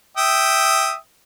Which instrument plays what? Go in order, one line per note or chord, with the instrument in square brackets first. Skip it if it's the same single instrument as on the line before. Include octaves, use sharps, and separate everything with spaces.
[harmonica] E5 G5 D#6